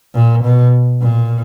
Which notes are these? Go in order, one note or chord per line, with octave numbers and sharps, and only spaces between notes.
A#2
B2
A#2